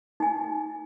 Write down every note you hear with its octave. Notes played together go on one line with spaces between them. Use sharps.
D#4 G#5